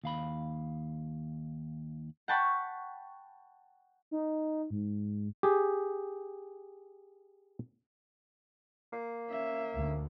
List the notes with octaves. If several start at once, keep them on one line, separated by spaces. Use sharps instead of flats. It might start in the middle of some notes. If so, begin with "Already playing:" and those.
D#2 F5 B5
F#5 G5 A5 B5 C#6
D#4
G#2
G4 G#4
A#3
C#4 E5
D2